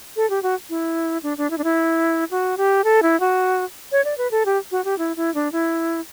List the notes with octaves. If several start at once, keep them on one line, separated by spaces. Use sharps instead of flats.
A4
G4
F#4
E4
D4
D4
E4
D4
E4
F#4
G4
A4
E4
F#4
C#5
D5
B4
A4
G4
F#4
G4
E4
E4
D4
E4